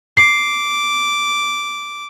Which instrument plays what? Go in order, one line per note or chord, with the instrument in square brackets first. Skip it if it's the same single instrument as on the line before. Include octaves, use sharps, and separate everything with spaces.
[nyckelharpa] D6 [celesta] C7